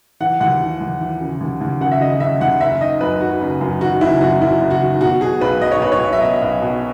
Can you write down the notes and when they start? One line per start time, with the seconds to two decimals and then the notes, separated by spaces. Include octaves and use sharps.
0.20 E3 F#5
0.40 D#2 F#5
0.61 E3
0.81 D#2
1.01 E3
1.21 C#3
1.41 D#2
1.61 D#2
1.81 C#3 F#5
1.91 E5
2.01 C#3 D#5
2.20 C#3 E5
2.41 D#2 F#5
2.61 F#1 E5
2.80 D#3 D#5
3.01 F#2 B4
3.21 D#3 F#4
3.41 F#1
3.61 F#2
3.81 D#3 F#4
4.01 F#1 E4
4.21 F#2 F#4
4.41 F#2 E4
4.61 F#1
4.71 F#4
4.81 D#3
5.01 B2 F#4
5.21 B2 G#4
5.41 B1 B4
5.61 B1 D#5
5.72 C#5
5.81 B1 B4
5.92 C#5
6.01 B1
6.13 E5
6.21 B2 D#5
6.42 B1
6.62 B2